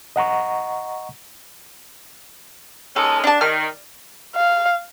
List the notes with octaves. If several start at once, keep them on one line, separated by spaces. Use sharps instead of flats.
D#5 F#5 A#5 C#6
D#2 G#3 C#4 A4
D4 A5
D#3 F6
F5